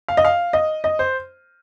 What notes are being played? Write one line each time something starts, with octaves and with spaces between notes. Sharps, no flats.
F5
D#5
F5
D#5
D#5
C5